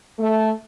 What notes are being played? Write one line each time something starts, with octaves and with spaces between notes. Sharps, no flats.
A3